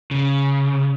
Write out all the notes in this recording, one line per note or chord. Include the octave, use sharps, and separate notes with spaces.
C#3